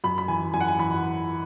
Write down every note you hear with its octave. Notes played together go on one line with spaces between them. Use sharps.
F#2 B5
B5
E3 G#5
F#2 G#5
F#5
G#5
E3 B5